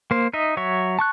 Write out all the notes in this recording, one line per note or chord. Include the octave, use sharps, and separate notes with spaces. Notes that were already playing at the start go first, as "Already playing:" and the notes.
A#3 C5
D#4 D#5 E5
F#3 C#5 E5
A5 C#6 F#6